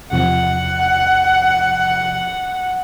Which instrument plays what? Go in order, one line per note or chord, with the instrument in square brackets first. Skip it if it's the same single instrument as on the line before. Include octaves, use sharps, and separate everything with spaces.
[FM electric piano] E2 C3 F3 [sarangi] F#5